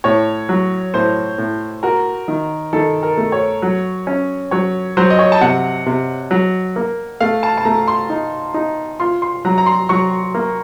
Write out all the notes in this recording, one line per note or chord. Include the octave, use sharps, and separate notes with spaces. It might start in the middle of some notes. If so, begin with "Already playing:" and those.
A2 C#5
F#3
A2 C5
A2
F#4 A#4
D#3
D#3 A4
A#4
A3
C#5
F#3
C#4
F#3 C#5
F#3 C5
D#5
C#5
A5
C3 F#5
C3
F#3
A#3
A3 F5
A5
A5
A3 A#5
C6
D#4
D#4
F4 C6
C6
F#3 A#5
A#5
C6
F#3 C#6
A#3